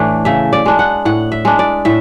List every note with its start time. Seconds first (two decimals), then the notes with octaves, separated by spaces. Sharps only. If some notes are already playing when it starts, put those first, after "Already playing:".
Already playing: A2 E3 A3 D4
0.25 C#3 E5
0.53 D5
0.66 G#3 D4
0.79 F#5
1.05 A2 F#5
1.32 E5
1.45 G#3 D4
1.59 D5
1.85 A2 E5